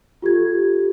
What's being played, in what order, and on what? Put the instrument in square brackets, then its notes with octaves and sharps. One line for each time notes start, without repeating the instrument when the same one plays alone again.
[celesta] F4 G4 A4 G#6